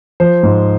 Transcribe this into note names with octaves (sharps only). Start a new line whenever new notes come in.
F3 C5
G#2